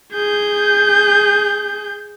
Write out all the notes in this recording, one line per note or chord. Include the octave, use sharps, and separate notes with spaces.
G#4 G6